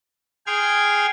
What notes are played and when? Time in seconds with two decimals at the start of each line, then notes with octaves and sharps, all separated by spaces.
0.47 G#4 G5 C6 F6 G#6